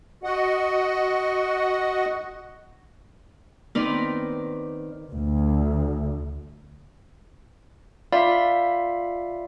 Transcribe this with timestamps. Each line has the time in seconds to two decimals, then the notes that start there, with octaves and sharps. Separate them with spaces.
0.24 F#4 D#5 F#5
3.75 D#3 B3 C4 D#4 B4 D5
5.11 D2
8.13 F4 D5 E5 F5 B5